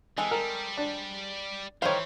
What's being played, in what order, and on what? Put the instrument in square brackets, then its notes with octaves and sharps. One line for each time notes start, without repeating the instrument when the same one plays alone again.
[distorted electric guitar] E3 [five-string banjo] G#3 C4 A4
[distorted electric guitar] G3 [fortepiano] A#4
[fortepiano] D4
[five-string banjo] D#3 G3 F5 [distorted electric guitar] E3 [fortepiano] C5 C#5